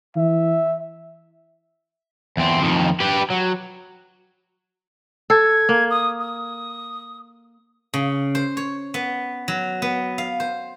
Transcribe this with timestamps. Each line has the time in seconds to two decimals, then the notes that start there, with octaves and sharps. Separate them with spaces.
0.16 E3 E5
2.37 E2 C4
2.62 F2 D#3
3.00 G4 B4
3.30 F#3
5.30 A4 G#6
5.69 A#3
5.90 D#6
6.19 D#6
7.94 C#3
8.35 C5
8.57 C#5
8.94 B3
9.48 F#3
9.82 B3
10.18 F5
10.40 C5